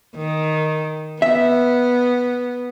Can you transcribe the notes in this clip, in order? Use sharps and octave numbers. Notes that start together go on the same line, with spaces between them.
D#3
B3 E5